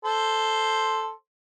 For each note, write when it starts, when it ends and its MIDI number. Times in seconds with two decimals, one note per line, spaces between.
0.05 1.11 69
0.05 1.11 72
0.05 1.11 84